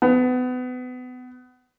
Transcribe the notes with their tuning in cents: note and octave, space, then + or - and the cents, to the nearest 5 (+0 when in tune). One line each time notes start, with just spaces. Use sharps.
B3 +30